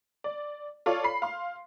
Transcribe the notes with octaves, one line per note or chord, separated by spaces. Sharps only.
D5
F4 A4 C#5 D5 F5
B5 C7
F5 C6